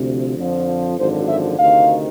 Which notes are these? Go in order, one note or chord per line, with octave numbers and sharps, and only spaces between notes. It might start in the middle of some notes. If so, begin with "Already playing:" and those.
Already playing: D2 C3 F3
F2 D3 F3
G#1 F#2 D3 F3 C5
E5
D2 C3 D#3 F5